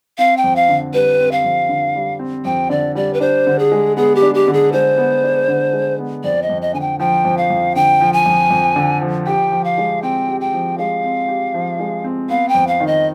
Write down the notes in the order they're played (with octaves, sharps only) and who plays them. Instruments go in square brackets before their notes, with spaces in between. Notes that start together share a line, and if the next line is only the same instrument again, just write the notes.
[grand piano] C4 [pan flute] F5
[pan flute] G5
[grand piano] F2
[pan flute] F5
[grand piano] D3
[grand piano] G3 [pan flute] B4
[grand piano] C4
[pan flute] F5
[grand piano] F2
D3
G3
C4
[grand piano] F2 [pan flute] G5
[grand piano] D3 [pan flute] D5
[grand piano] G3 [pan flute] D5
[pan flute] B4
[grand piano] D4 [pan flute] C5
[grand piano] D3
[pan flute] G#4
[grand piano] G#3
[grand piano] B3 [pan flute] G#4
[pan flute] G4
[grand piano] D4
[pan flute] G4
[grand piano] D3
[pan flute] G#4
[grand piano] G#3 [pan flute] C5
[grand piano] B3
D4
D3
G#3
B3
[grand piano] F2 [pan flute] D5
[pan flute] D#5
[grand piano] F2
[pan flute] D#5
[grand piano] D3 [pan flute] G#5
[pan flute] G5
[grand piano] F3 [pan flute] G5
[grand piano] F2
[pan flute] F5
[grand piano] F2
[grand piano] D3 [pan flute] G5
[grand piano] F3
[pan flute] G#5
[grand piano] F2
F2
D3
F3
[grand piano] G4 [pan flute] G5
[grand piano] F3
[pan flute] F5
[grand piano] G#3
[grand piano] C4 [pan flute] G5
[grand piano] G4
[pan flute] G5
[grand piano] F3
[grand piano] G#3 [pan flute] F5
[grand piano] C4
G4
F3
G#3
C4
[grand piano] B3 [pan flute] F5
[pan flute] G5
[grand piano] F2
[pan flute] F5
[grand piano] D#3
[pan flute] D#5